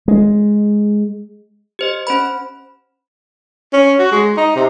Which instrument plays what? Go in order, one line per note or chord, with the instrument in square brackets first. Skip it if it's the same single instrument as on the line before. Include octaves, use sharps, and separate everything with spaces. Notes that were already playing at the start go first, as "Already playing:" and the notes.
[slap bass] G#3
[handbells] G4 C5 D#5
C#4 C5 B5
[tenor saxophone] C#4
F#4
G#3
D#4
C3